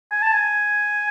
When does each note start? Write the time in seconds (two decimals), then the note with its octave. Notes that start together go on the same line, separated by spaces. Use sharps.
0.11 G#5
0.22 A5
0.33 G#5